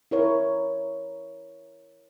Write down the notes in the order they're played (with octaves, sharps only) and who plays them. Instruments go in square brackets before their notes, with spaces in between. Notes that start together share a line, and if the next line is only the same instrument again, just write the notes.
[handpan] E4 A#4 C#5